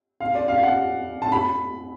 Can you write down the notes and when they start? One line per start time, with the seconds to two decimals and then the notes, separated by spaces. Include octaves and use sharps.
0.20 F5
0.35 D5
0.48 F5
0.63 F#5
1.22 A5
1.32 B5